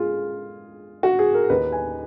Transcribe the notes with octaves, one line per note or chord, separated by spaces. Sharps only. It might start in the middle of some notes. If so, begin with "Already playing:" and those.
Already playing: G#3 F4 G#4
F#4
G#4
A#4
D#2 D#3 A#3 D#4 B4
G#5